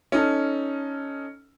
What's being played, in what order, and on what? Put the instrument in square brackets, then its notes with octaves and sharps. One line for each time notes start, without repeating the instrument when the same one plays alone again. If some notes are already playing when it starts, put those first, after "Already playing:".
[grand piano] C#4 D#4 A4